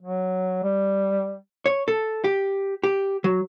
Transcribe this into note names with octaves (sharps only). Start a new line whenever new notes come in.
F#3
G3
C#5
A4
G4
G4
F#3